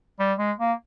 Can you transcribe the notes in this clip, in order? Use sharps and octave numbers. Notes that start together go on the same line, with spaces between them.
G3
G#3
A#3